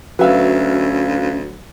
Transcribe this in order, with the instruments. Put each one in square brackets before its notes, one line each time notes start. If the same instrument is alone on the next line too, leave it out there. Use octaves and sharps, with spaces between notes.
[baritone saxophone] D2 [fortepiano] F#3 [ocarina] C#4 [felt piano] B4 E5 F5